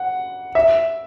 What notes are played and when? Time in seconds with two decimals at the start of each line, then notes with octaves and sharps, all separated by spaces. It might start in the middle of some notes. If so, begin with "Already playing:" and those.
Already playing: F#5
0.55 E5